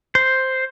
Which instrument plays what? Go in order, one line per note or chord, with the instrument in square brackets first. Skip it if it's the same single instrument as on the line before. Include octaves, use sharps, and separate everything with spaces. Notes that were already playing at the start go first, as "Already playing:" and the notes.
[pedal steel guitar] C5